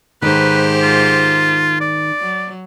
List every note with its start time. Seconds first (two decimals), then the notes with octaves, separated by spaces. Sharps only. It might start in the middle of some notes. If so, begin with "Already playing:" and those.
0.22 G#2 D#3 G4 B4 C5
0.82 F4
1.81 D5
2.20 F#3